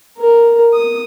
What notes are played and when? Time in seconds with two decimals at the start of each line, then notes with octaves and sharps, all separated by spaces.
0.18 A#4
0.73 D#6